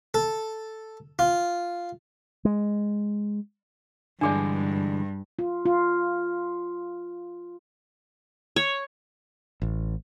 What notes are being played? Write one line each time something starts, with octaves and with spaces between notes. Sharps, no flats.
A4
F4
G#3
G2 D3 E3 G#3 D4 G#4 D5
F4
F4
C#5
A1